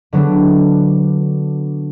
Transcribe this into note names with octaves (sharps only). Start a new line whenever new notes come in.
D3 F#3 B3 D4